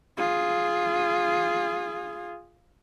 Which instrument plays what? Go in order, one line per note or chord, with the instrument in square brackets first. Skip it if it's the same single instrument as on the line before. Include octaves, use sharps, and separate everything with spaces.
[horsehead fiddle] F4 G#4